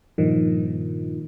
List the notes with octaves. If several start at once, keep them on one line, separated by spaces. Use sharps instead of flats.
G2 A#2 D#3 F3